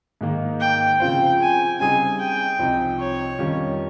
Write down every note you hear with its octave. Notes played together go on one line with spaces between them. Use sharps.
G#2 D#3 A#3
G5
C#3 F3 C4 F4 C5 G5
G#5
C#3 G3 C4 D#4 G#4 G#5
G5
C2 C3 F3 C4 D#4
C#5
F2 D#3 G3 C#4 F4